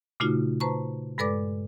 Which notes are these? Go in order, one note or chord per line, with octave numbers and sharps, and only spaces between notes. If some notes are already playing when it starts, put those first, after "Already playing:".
A#2 C#3 A3 D#4 F4 F#4
B4 C5 A5 A#5 C#6
G2 G#3 A4 B4 D5 D6